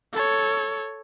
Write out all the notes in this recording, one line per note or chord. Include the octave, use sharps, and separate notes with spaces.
A4 C#5